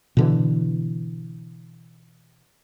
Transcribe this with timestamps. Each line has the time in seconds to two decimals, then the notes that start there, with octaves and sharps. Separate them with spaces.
0.17 B2 D3 E3